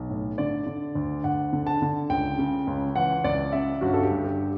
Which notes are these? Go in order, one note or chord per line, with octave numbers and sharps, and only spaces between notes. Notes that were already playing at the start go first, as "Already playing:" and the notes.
Already playing: B1
A2
D3 D5
D3
D2
D2 F#5
D3
A5
D3
C#2 G5
C#3
C#2
E3 F#5
C#2 D5
C#3 E5
G1 F#4
A4
G4
G2
G4